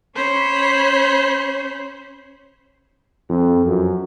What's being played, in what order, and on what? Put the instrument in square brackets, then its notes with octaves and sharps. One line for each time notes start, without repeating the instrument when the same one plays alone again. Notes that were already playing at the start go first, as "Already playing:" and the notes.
[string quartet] C#4 C5 C#5 B5
[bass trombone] F2
F#2